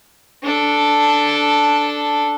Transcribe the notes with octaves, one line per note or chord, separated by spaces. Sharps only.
D4 A4